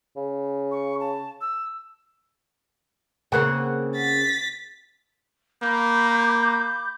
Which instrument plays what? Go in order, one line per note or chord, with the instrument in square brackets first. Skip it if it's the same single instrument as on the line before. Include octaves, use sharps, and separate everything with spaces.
[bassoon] C#3
[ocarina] C#6
A5
E6
[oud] C#3 A#3 C4 [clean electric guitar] F#5
[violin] A6 B6
[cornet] A#3 [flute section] B5 D6 G6